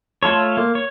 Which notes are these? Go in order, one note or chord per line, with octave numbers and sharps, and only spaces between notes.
A3 F4 A4 C#5
A#3
C#5